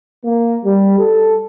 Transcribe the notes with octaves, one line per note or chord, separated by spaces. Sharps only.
A#3
G3
A4